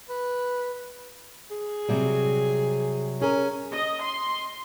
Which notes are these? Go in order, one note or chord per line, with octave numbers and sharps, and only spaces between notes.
B4
G#4
C3 F#3 G3
C#4 G#4 A#4
D#5
C6